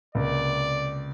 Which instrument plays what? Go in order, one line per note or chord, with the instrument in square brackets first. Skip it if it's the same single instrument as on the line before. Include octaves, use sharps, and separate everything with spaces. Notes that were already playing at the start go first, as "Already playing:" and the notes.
[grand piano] C#2 C3 A#3 [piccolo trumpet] D5